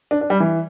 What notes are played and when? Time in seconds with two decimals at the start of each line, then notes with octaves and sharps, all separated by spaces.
0.11 D4
0.21 D4
0.30 G3
0.40 E3